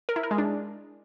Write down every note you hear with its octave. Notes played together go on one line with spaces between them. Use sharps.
A#4
E4
A#4
G#3
D4